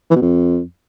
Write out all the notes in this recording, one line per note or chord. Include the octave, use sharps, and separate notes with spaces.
E3
B2
F2